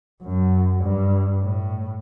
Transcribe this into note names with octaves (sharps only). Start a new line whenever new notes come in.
F#2
G2
A2